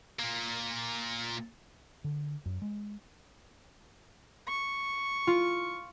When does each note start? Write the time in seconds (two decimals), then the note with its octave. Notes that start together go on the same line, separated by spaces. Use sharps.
0.19 A#2 A#3
2.04 D3
2.46 F#2
2.62 G#3
4.48 C#6
5.27 F4